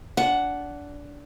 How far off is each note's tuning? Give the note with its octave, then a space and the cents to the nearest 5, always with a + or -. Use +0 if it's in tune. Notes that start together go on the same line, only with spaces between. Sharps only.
D4 -20 F#5 +5